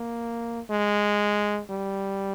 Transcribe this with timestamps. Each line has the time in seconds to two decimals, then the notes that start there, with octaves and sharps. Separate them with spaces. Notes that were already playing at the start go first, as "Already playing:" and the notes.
Already playing: A#3
0.70 G#3
1.70 G3